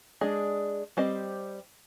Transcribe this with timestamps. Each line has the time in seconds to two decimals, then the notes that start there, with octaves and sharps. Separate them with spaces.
0.21 G#3 D4 G#4 D#5
0.97 G3 C4 G4 C5 D#5